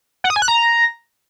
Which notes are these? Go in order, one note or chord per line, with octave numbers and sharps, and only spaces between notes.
F#5
D#6
G#5
F#6
A#5